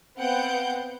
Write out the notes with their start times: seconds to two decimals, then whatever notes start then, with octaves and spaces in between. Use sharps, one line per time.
0.18 B3 C4 F5 F#5 G6 D7